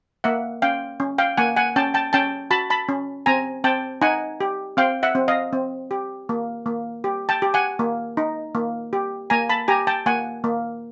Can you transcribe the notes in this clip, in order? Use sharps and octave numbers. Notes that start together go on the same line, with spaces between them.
A#3 E5 F#5
C#4 F5 G5
C#4
F5 G5
A#3 F#5 G#5
F#5 G#5
C#4 G5 A5
G5 A5
C#4 G5 A5
F#4 A5 B5
A5 B5
C#4
C4 G#5 A#5
C4 G5 A5
D#4 F#5 G#5
G4
C4 F5 G5
E5 F#5
C4
D#5 F5
C4
G4
A#3
A#3
G4
G5 A5
G4
F#5 G#5
A#3
D#4
A#3
G4
A#3 G#5 A#5
A5 B5
G4 G#5 A#5
G5 A5
A#3 F#5 G#5
A#3